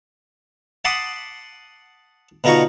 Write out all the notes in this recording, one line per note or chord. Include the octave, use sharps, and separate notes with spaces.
F#5 A5 B5 C6 D6 D#6
B2 D3 D#4 F4 A#5 C#6